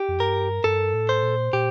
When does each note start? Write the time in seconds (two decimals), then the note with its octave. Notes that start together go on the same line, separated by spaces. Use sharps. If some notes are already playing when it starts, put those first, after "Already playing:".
Already playing: G4
0.08 F2
0.20 G2 A#4
0.64 G2 A4
0.94 A2
1.09 C5
1.23 A#2
1.53 A#2 G4